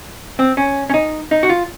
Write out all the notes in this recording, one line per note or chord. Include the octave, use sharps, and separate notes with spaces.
C4
C#4
C#4
D#4
D#4
F#4
F4